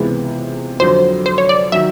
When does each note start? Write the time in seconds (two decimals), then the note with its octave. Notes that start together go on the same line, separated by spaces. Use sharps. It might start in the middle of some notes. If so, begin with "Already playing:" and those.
Already playing: C#2 C3 E3 G#3 B3
0.80 F2 D3 F#3 C5
1.26 C5
1.38 C#5
1.49 D5
1.72 D#3 F#3 E5